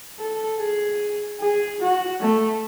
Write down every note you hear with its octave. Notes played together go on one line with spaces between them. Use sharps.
A4
G#4
G#4
F#4
A3